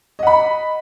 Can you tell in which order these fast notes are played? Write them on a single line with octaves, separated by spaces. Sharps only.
D#5 F#5 B5